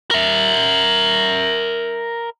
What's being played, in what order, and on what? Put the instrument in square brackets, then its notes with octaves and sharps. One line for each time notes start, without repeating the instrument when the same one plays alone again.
[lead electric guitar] A#4 E5